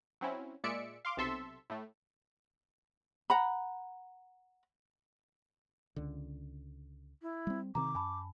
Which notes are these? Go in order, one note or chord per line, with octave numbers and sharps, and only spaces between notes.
F#3 C4 C#4 E4
A#2 G#3 D5 E5 C#7 D7
F5 C6 D6
B1 C3 A4 E5 C6
A2 A3
F#5 A#5 B5
C#2 D3
E4
G3 C4
C3 D#3 C4 A#5 D6
F#2 G#5 A5 B5